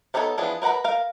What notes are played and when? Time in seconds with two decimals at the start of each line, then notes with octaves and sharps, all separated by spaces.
0.14 B3 D4 D#4 A4 C#5
0.38 E3 F3 B3 D4 G#4
0.62 A#4 B4 F#5 A#5 B5
0.84 A#4 F5